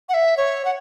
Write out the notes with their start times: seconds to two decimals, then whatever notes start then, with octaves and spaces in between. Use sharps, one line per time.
0.09 F#5
0.14 E5
0.37 C#5
0.65 F#5